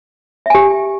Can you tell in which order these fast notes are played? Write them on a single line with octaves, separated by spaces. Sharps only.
E5 G#5 G4